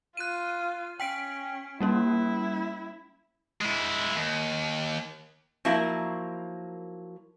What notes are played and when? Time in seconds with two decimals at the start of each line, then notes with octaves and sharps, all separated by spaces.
0.17 F4 F#6 D#7
1.00 C#4 G5 B6 D7
1.81 G3 A#3 C#4 E4
3.61 G#3 E4
4.15 D#2
5.65 F3 F#3 A#3 E4 A#4